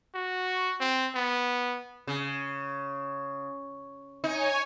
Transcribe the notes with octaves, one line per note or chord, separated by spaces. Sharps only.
F#4
C4
B3
C#3
D#4 C#5 G#5